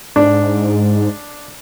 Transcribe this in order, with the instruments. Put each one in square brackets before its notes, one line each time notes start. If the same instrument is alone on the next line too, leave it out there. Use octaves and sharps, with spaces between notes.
[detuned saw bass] G#2 [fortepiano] D4